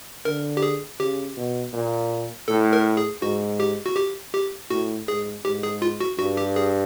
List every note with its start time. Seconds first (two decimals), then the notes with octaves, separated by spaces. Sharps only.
0.25 D3 A#4
0.57 G4
0.62 G#4
1.00 C#3 G4
1.37 B2
1.73 A#2
2.48 A2 A4
2.73 A#4
2.97 G#4
3.22 G#2 F#4
3.60 G4
3.86 F#4
3.97 G4
4.34 G4
4.70 A2 F#4
5.08 G#2 G#4
5.44 G#2 G4
5.63 G#4
5.82 F4
6.01 F#4
6.18 G2 F#4
6.37 G4
6.56 G#4